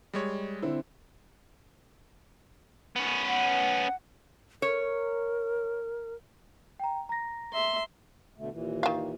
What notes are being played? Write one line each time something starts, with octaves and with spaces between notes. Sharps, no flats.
G3 G#3 C#5
D3 C4 E4
B3 C#4
F#5
A#4 C#5
G5 A#5
A#5 A#6
E5 C6
B2 D3 A3
D#2 A#2 E3
D#3 F5